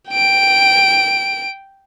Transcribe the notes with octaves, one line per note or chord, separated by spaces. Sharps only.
G5 D7